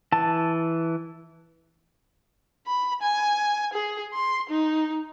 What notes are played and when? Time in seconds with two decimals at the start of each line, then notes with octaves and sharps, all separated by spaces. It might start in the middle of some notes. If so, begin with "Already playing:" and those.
0.12 E3 A5
2.67 B5
3.02 G#5
3.73 G#4
4.13 C6
4.49 D#4